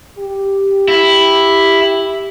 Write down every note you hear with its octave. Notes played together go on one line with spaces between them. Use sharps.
G4
E4